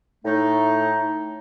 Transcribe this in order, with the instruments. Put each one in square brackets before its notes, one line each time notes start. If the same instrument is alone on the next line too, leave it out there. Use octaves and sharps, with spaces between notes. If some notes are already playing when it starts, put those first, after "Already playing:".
[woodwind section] A2 A3 D#4